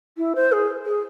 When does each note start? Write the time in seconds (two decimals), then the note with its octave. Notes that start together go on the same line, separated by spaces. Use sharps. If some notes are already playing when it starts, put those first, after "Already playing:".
0.17 E4
0.35 C5
0.52 G#4
0.86 G#4